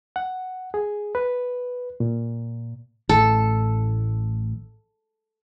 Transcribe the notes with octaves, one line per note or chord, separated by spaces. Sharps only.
F#5
G#4
B4
A#2
A1 A2 A4